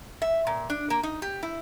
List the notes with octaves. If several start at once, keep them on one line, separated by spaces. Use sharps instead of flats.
E5
A#2
D4
A#3
D#4
G4
E4